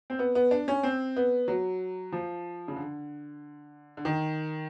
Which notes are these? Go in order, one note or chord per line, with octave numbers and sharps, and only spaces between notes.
C4
B3
B3
D4
C#4
C4
B3
F#3
F3
C#3
D3
D3
D#3